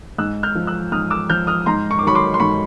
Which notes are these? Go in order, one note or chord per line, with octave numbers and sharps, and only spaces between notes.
G#2 E6 F#6
F6 G6
F3
E6 F#6
G#2 D#6 F6
D6 E6
F3 F6 G6
D#6 F6
G#2 A#5 C6
C#6
D6
D#3 F#3 B5 C#6
C6 D6
C6
G#2 B5 C#6